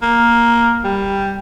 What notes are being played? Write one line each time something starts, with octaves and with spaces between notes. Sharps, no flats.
A#3
G3